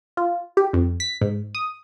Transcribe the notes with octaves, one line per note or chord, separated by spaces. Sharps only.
F4
G4
F2
B6
G#2
D#6